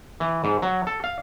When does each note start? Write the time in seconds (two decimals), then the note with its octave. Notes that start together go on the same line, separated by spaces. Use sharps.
0.20 E3
0.44 G#2
0.62 F#3
0.87 A4
1.04 F5